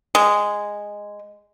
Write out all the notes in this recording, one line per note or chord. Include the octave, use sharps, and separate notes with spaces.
G#3